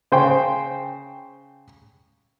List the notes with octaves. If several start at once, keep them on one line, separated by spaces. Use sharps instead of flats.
C#3 C5 G5